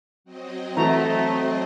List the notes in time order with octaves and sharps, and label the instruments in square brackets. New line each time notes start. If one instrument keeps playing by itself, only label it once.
[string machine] F#3 C4 D#5
[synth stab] E3 F#4 [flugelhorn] A3 [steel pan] A#5